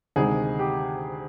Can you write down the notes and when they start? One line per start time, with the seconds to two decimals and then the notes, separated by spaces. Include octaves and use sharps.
0.16 D2 C3 D#3 G#3 G#4
0.59 G4